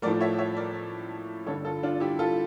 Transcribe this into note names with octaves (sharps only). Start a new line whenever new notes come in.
A2 F3 A3 A#4 D5
C#5 E5
C#5 E5
A#4 D5
G2 D3 G3 A4 C#5
F4 A4
D4 F4
E4 G4
F4 A4